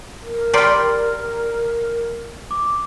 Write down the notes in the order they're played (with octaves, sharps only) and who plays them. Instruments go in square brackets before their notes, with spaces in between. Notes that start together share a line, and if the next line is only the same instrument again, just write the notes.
[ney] A#4
[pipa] G3 G4 C6 [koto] D5 G5 [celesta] A#5 F6
[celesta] D6